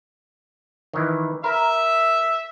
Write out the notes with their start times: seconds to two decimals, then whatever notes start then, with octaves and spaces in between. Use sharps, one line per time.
0.93 D#3 E3
1.44 A#4 E5